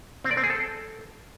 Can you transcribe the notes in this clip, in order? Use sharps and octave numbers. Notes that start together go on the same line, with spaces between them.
C4
D5
C4
G#4
A4